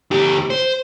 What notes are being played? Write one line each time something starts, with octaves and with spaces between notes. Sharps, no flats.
D2 G4
C5